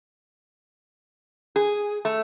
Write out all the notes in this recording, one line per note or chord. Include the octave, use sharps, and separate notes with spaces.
G#4
A3